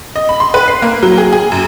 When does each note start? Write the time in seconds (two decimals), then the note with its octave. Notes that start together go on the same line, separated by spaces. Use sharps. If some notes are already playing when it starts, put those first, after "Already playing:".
0.16 D#5
0.29 B5
0.40 C6
0.54 B4
0.68 C7
0.82 A#3
1.03 F#3
1.18 G#4
1.33 G#4
1.52 F#2